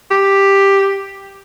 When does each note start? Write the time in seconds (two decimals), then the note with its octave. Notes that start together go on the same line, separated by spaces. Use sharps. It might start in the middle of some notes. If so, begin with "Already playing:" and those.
0.11 G4